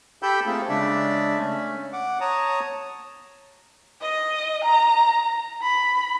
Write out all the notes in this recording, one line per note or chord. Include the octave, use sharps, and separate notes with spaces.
G4 A4 G5 B5 E6 G6
A3 A#3 C4 F4 G#4 A4
C#3 G#3 D4 D5 E5
A3 C#4
F#5 D6
C#5 A5 A#5 D#6
D#5
A#5
B5